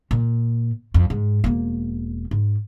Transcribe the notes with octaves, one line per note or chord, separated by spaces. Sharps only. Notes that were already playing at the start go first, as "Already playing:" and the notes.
A#2
F2
G#2
E1 A#3
G#2